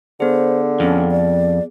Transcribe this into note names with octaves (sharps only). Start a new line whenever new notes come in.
D3 B3 G#4 C5
F2 C#4
D5